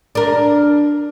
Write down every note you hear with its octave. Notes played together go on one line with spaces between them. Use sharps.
D4 A#4